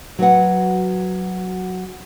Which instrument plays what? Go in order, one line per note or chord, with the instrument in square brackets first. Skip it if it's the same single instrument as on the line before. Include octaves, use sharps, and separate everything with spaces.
[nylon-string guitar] F#3 F#4 B4 F#5